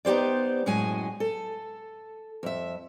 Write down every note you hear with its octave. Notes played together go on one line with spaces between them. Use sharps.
B3 D#4 G4 C5 D5
F#2 A2 G#3 F#4 G#5
A4
F2 E5